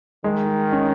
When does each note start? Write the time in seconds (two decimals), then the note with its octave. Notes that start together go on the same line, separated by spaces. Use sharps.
0.24 D#3 G#3
0.72 C#4